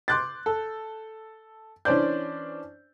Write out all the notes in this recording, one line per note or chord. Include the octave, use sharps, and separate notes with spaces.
C6 D6 F#6 G6 A6
A4
E3 C#4 D4 C5 D5 G6